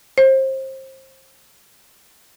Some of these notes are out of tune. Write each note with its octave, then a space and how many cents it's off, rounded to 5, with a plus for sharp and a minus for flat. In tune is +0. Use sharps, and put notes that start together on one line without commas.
C5 +30